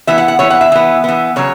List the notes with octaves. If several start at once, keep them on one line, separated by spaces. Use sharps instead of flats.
E3 B3 E5
F#5
F#5
E3 B3 C#5
F#5
E5
E3 B3
E3 B3
C#3 F#3 C#5